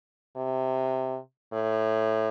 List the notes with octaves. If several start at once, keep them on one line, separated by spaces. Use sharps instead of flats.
C3
A2